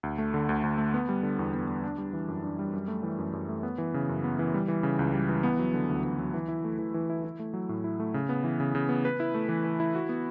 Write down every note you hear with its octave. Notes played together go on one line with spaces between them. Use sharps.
D2
A3
D3
D2
D2
A3
B3
G3
D3
E2
B3
G3
D4
G3
E3
F#2
D4
G3
F#2
A3
E3
F#2
F#2
A3
B3
E3
C#3
F#2
B3
E3
G3
E3
C#3
C#2
G3
E3
B3
F#3
D3
D2
B3
F#3
E3
E4
A3
E3
E3
E4
E4
A3
F#3
A2
E4
A3
C#3
B3
E3
C#3
C#3
B3
B4
E4
A3
E3
B4
E4
F#4
B3